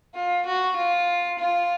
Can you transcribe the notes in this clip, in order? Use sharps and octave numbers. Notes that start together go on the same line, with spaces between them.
F4
F#4
F4
F4